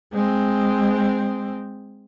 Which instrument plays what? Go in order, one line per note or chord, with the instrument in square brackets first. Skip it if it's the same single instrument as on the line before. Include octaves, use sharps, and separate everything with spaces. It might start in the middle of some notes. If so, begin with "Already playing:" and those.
[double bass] G#3 C4